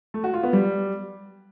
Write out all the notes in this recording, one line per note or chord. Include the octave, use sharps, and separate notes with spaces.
A3
F#4
F4
B3
G3